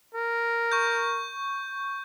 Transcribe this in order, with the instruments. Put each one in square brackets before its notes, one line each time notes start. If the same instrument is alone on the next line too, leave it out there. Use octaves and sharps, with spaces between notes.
[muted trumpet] A#4
[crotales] C#6 G6